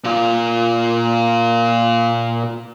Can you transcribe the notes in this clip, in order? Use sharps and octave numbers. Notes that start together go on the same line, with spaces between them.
A#2 F4